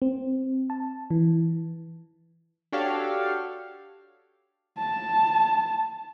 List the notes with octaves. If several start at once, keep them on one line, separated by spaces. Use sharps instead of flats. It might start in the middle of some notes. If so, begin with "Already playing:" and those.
C4
A5
E3
D4 F#4 G4 A4 C#5 F5
A5